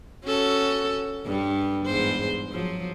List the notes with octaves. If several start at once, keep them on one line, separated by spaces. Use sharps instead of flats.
C#4 F#4 A4
G2 G3
E2 G#2 C5
F3 F#3